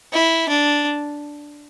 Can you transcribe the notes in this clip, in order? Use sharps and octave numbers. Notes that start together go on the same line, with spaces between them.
E4
D4